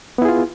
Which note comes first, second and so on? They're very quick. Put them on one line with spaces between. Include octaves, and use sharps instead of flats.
B3 E4 G#4 F4